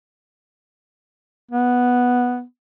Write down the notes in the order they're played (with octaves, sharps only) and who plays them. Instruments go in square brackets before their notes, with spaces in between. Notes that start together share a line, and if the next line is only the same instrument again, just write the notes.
[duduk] B3